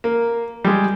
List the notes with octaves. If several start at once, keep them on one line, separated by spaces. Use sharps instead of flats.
A#3
G3 G#3